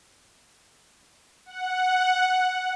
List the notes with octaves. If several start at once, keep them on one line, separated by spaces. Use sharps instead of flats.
F#5